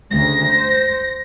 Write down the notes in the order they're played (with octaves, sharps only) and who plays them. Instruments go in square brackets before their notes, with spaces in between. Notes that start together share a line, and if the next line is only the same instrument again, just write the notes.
[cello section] D2 C#3 [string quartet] A#6
[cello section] C5